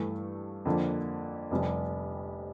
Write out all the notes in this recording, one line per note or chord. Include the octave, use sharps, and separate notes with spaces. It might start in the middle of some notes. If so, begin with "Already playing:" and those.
Already playing: G2 E3 A3
F2 D3 F3 A#3
F1 F2 C3 G3